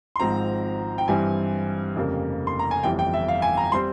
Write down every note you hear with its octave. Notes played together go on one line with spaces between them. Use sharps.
C6
G#1 G#2 F3 C4 A#5
G5
G2 E3 G3 C4 G#5
F1 F2 C#3 G3 A#3
C6
A#5
G#5
G1 F2 E3 G3 G5
G5
E5
F5
G#5
A#5
G3 C4 C6